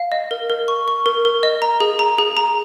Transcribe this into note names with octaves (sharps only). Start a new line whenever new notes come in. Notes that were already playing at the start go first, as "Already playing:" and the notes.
Already playing: F5
D#5
A#4
A#4
C#6
C#6
A#4
A#4
D#5
A#5
G#4
A#5
G#4
A#5